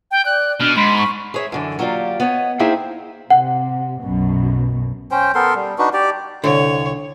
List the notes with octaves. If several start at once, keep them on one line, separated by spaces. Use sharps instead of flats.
G5
D5 F#6
B2 D4 F6
G#2 B5 C6
C#6
G#4 C#5 E5
F#2 D3 E3
F#3 A#3 F4 G4 D5
B3 C#5 D#5
A#3 C4 D#4 E4 G#4 C5
C3 F#5
B1 F#2 B2
C#4 C5 G5
B3 A4 A#4 C6
G3
D4 D#4 F#4 B4
G4 D5
C2 D3 C#5